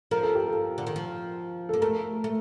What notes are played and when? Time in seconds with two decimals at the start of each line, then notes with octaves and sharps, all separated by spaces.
0.11 F3 A#4
0.23 A4
0.35 G4
0.48 A4
0.78 D3
0.87 D#3
0.96 F3
1.69 A#3 A4
1.81 A3 A#4
2.24 A3